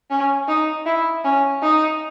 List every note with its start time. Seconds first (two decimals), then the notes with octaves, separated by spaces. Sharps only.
0.10 C#4
0.48 D#4
0.86 E4
1.24 C#4
1.62 D#4